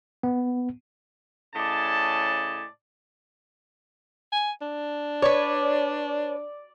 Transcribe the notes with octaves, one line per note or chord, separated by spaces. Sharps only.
B3
A2 C#3 D5 D#5 G#5 A5
G#5
D4
B4 C#5 D5